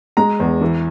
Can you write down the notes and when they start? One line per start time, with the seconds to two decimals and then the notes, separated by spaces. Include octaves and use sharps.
0.17 G#3 A#5
0.40 E2
0.61 E3